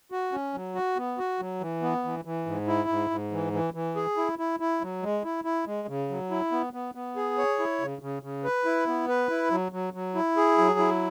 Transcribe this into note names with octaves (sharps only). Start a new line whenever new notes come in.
F#4
C#4
F#3
F#4
B3
F#4
F#3
E3
B3
E3
E3
G#2
E4
G#2
G#2
E3
E3
E3
G#4
E4
E4
E4
F#3
G#3
E4
E4
G#3
C#3
F#3
E4
B3
B3
B3
G#4
C#5
E4
C#3
C#3
C#3
B4
E4
B3
B4
E4
F#3
F#3
F#3
E4
G#4
F#3
E4